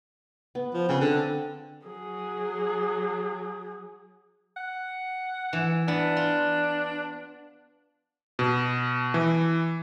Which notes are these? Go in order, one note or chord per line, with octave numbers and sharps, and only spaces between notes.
B3
F3
C#3 C4
D3
F#3 G#4
F#5
E3
B3 D4
F4
B2
E3